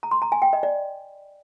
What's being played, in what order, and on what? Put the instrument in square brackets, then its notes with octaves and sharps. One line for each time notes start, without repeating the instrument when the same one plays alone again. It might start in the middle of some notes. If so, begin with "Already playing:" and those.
[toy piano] A#5
C6
A#5
G#5
G5
D#5
D5